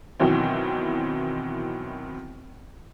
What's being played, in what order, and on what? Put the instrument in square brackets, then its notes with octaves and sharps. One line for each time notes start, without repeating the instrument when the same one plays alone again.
[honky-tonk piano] B2 D#3 E3 F#3 C4